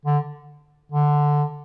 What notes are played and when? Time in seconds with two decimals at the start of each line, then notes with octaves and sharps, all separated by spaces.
0.05 D3
0.92 D3